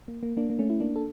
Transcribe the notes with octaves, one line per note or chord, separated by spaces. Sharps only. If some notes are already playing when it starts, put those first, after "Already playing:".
A#3
A#3
A#3 D4
A#3
A3 C#4
E4
A#3 D4
A4